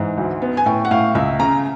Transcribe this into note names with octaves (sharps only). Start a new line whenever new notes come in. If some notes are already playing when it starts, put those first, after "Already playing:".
Already playing: G#2 E3
D2
B3
G#5
A2 G5
F#5
A2 F5
C#2 E5
C#3 A#5